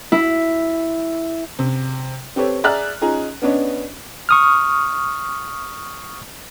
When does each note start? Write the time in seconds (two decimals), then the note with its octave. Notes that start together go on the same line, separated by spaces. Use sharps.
0.12 E4
1.59 C3
2.36 C4 G4 A4 B4 C#5
2.64 G#4 D5 E5 A#5 F6 F#6
3.01 C#4 D#4 F4 G#4 A#5
3.42 B3 C#4 D4 B4 C#5 D#5
4.29 C#6 D#6 F6